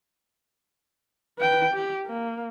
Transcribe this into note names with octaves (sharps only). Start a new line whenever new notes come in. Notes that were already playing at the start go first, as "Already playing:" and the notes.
B4 G5
G4
A#3